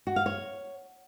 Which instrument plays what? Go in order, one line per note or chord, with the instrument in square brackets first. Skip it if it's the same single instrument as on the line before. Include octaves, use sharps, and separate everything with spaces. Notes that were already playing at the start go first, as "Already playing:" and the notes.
[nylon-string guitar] F#4
F5
C#5